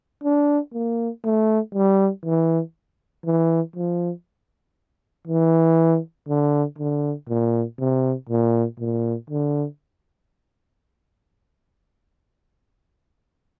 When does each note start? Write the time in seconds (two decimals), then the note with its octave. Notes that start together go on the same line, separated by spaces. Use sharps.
0.24 D4
0.74 A#3
1.24 A3
1.74 G3
2.25 E3
3.26 E3
3.76 F3
5.27 E3
6.28 D3
6.78 D3
7.29 A#2
7.79 C3
8.29 A#2
8.79 A#2
9.30 D3